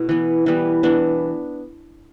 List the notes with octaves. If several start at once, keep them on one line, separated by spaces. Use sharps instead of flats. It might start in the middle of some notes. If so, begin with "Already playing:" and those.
Already playing: B2 A3 E4
E3 B3
E3 G3 B3
E3 B3 D4